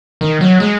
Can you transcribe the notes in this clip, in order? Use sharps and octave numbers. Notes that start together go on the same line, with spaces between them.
D#3
F#3
G#3